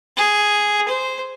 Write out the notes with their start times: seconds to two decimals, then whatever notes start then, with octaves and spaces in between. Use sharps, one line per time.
0.17 G#4
0.88 C5